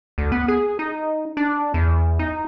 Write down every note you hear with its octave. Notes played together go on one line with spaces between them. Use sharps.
D2
B3
G#4
D#4
D4
E2
D#4